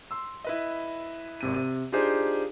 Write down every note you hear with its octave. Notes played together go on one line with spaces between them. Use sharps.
C6 E6
E4 B4 D#5
G#1 C3 D#7
C3 D#7
D4 D#4 F4 G4 G#4 C5